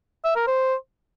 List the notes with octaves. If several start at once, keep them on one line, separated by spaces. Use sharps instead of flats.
E5
A#4
C5